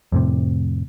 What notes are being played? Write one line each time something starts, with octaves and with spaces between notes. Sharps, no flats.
F2 A2 C3